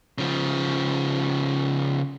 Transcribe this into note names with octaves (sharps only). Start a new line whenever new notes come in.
C#3 F3